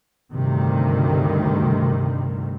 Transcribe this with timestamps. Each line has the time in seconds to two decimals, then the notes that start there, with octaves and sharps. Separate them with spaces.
0.32 D2 G2 C3 D#3